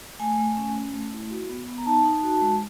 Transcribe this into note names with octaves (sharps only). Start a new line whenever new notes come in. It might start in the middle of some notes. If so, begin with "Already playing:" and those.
A3 G#5
A3
C#4
C#4
A3
E4
F#4
B3
B3
A#5
D#4 A5
D#4
F#4
G#3